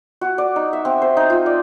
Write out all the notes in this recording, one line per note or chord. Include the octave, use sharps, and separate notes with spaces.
F#4
D5
D#4
E5
C4
C5
D#4
F4
D5